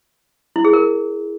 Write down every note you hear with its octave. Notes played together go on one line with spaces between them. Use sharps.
E4
G#4
A#4